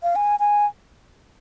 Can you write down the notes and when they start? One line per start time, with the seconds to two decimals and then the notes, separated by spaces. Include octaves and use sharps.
0.03 F5
0.16 G#5
0.40 G#5